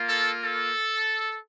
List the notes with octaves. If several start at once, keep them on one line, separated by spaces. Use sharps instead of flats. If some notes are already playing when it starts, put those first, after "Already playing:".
Already playing: A#3 F4
A4
A4